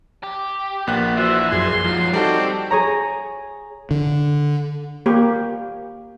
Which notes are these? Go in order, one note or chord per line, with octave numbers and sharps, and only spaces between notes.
G4
A#1 A#3 B3 F#6
E3 F#4 C5 E5
F#2 G#4 C6
G#2 F3 F#3
G3 C4 D#4 F#4 A4 D5
G#4 C#5 A#5
D3
A#3 G4